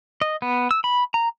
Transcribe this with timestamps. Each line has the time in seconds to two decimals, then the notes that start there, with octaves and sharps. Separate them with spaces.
0.22 D#5
0.42 B3
0.71 E6
0.84 B5
1.14 A#5